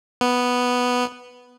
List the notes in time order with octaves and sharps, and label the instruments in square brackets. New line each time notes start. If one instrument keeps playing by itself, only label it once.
[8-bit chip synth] B3